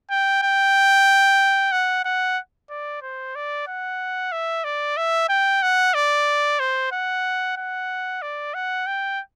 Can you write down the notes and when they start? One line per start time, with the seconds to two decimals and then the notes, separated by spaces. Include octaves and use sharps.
0.10 G5
0.42 G5
1.72 F#5
2.05 F#5
2.70 D5
3.02 C5
3.35 D5
3.67 F#5
4.32 E5
4.64 D5
4.97 E5
5.29 G5
5.62 F#5
5.94 D5
6.60 C5
6.92 F#5
7.57 F#5
8.22 D5
8.54 F#5
8.87 G5